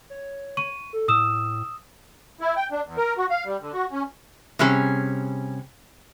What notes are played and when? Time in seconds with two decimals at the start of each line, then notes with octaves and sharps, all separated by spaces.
0.10 C#5
0.57 C#6 D#7
0.93 A4
1.08 A2 D#6 E6 E7
2.41 E4
2.56 G5
2.72 D4
2.85 E2
2.97 A#4
3.17 F#4
3.30 F5
3.45 G3
3.61 D3
3.73 F#4
3.92 C#4
4.59 C3 G3 C#4 G#4